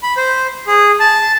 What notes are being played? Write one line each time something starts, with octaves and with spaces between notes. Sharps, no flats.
B5
C5
G#4
A5